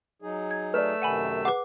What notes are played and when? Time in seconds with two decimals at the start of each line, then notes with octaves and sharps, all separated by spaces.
0.22 F#3 D#4 G#4
0.51 G#6
0.74 A3 B4 D5 E6
1.02 F#2 C3 D#3 F#5 G#5 B5
1.45 G#4 B4 F#5 D6